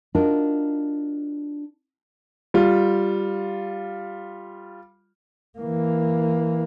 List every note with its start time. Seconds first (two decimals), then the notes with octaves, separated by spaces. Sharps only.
0.15 D4 D#4 F4 F#4 A#4 D#5
2.54 G3 F4
5.59 E3 A#3